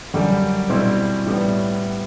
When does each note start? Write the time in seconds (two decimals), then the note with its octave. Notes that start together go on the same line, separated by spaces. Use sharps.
0.14 F#2 D3 G3
0.70 B2 G3 C4 E4
1.26 A2 G3 B3